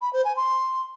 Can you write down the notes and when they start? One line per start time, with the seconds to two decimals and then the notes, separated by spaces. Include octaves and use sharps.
0.01 B5
0.13 C5
0.24 G#5
0.36 C6